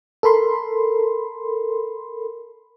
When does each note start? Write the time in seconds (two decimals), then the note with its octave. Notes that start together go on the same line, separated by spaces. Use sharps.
0.23 A4 A#4 B5 C6